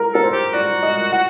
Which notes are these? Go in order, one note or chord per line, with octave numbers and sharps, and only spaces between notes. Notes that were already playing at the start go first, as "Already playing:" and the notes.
Already playing: A#4
A4 A#4
C5
G4
F#4 D5
D#5
F#5